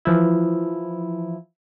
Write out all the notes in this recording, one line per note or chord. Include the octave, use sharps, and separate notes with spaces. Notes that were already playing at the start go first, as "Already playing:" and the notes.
E3 F3 E4